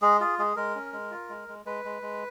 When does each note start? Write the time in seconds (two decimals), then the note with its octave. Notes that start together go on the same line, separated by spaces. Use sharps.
0.02 G#3 G#4
0.20 F4 G#4
0.39 G#3 G#4
0.56 G#3 A#4
0.75 C#4
0.93 G#3
1.11 F4
1.29 G#3
1.48 G#3
1.65 G#3 B4
1.85 G#3
2.02 G#3